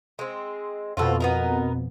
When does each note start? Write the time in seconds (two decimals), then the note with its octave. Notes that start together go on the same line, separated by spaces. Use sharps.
0.19 G#3 C4
0.97 F2 B2 F4 F#4 A4
1.20 B3 D#4 A#4